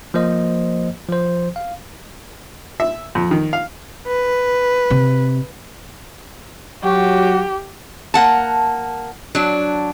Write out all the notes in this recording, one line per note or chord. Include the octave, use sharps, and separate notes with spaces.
F3 A#3 C5 D#5
F3 C5
F5
E5
F2
D#3
F5
B4
C3
F#3 F#4 G4
A#3 F#5 A5
F#3 D4